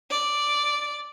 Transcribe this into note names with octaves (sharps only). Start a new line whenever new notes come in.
D5